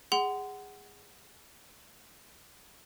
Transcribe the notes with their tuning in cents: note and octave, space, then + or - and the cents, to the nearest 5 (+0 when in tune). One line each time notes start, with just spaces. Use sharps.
G#4 -15 F#5 +15 C6 -25